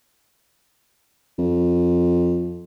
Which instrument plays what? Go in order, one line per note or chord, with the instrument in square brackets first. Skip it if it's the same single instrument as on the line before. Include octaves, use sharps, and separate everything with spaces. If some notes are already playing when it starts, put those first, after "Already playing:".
[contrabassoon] F2